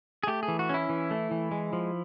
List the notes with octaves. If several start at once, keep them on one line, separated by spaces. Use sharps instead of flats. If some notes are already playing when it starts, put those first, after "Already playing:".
G#4
A3 G4
G#4
E3
F#4
C#4 E4
E3
A3
E3
G#3
F3